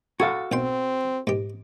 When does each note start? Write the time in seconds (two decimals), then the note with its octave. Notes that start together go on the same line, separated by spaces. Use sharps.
0.20 F#4 A4 F5 G#5
0.52 B1 C4 G5 C6
1.27 G#2 G4